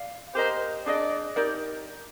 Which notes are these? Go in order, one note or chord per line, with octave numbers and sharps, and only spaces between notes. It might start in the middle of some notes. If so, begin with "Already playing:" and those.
Already playing: D5 F5
G4 A#4 C5 D#5 A#5
D4 G#4 D5 D#5
D#4 G4 A#4 D5